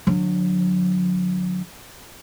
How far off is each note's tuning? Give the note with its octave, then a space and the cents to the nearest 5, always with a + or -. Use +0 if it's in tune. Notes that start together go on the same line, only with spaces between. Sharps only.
D3 +15 F#3 -30